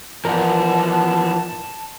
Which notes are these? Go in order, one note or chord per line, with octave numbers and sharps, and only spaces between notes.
E3 F3 B3 A#4 D5 F#5 A5